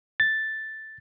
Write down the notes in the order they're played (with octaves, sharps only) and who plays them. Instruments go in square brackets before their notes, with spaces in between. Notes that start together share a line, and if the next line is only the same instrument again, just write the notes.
[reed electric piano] A6